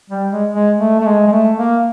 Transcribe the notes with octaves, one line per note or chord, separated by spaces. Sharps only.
G3
G#3
G#3
A3
A3
G#3
G#3
A3
A#3